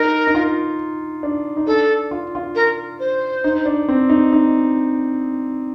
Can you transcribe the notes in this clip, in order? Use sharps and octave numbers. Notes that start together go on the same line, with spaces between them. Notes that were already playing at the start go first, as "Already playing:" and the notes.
Already playing: D#4 A#4
D#4
F4
D4
D#4
D4 A4
F4
F4
A#4
C5
D#4
D4
C4
D#4
D#4